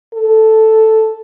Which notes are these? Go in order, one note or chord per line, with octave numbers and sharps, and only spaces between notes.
A4